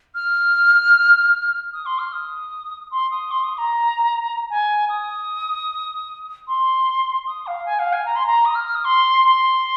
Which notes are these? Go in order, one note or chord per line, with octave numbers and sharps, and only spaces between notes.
F6
D#6
C6
F6
D#6
C6
D#6
C6
D#6
A#5
G#5
D#6
C6
D#6
F5
G#5
F5
G#5
A#5
C6
A#5
D#6
F6
F6
D#6
C6
C6